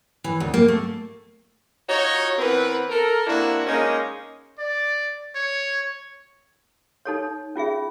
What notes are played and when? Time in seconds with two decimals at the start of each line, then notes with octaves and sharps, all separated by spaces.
0.24 E3
0.40 D2
0.54 A#3
0.68 A3
1.89 D#4 F4 F#4 C#5
2.38 E3 B3 C4 A#4 B4
2.90 A4 A#4
3.26 C3 A#3 D4 E4 F#4
3.67 G#3 A#3 C#4 D#4
4.59 D5
5.35 C#5
7.05 D#4 A4 C#5
7.55 C#4 F4 G#4 E5